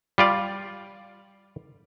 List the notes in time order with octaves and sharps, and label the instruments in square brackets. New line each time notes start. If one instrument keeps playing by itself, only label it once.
[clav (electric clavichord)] G3 F4 D5